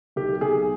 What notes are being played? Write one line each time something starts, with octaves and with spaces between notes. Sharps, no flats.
B1 G4
B1 G#4